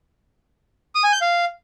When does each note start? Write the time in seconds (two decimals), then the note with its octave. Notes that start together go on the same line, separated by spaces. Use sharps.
0.95 D#6
1.04 G#5
1.13 G6
1.21 F5